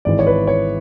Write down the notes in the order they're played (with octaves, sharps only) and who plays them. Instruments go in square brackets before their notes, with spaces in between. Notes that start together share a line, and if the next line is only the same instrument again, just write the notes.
[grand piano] G#1 G#2 E3 D5
C#5
B4
C#5